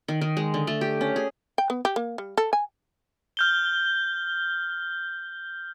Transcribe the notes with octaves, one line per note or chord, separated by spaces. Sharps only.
D#3
D#3
G#3
D3
A3
G4
C#4
G#4
G5
B3
G4
A#3
G3
A4
G#5
F6 G6 G7